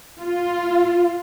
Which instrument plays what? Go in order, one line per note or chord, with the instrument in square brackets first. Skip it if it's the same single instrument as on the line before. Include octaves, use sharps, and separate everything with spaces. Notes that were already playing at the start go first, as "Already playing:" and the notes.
[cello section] F4